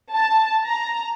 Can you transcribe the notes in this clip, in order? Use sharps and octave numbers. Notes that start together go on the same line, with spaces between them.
A5
A#5